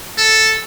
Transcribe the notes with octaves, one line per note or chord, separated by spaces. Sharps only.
A4